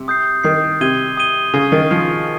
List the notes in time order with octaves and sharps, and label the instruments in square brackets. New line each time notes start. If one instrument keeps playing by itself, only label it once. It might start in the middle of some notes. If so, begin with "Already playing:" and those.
Already playing: [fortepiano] C3
[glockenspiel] D#6 G6 C7
[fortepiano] D#3 [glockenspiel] D#6 G6 C7
[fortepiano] C3 [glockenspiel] D#6 G#6 D#7 G7
[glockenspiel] D#6 G#6 D#7 G7
[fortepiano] C#3 [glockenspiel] C#6 G#6 C7
[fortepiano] D#3
[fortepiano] F3 [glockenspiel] C#6 G#6 C7